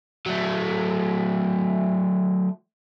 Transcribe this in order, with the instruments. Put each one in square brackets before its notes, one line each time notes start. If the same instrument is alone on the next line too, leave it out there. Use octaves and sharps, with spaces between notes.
[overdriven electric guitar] F#3 A3